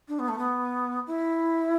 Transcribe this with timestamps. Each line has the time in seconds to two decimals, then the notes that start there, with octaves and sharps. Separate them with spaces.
0.08 D4
0.19 B3
0.28 A3
0.38 B3
1.07 E4